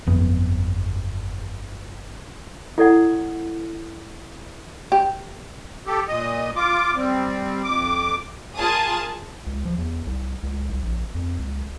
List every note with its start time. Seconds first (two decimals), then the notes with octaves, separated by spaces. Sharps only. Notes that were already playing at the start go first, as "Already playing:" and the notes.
0.07 G1 F2 B3
2.78 E4 A4 D5 F#5
4.92 G4
5.87 G4 A4
6.08 A#2 D#5
6.56 F4 D6
6.95 G3 C4
7.64 F2 D6
8.57 F4 G#4 A#4 A5 D#6
9.47 C#2
9.65 F3
9.78 E2
10.07 C2
10.43 C#2
10.70 C2
10.83 A#1
11.15 F2
11.39 C#2